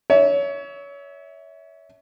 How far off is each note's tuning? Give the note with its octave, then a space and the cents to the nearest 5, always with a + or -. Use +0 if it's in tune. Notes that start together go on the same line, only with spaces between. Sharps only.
C#5 +25 E5 -20